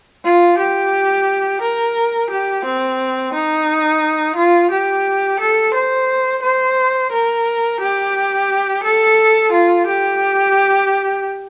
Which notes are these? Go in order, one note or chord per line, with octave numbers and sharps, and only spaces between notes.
F4
G4
A#4
G4
C4
D#4
F4
G4
A4
C5
C5
A#4
G4
A4
F4
G4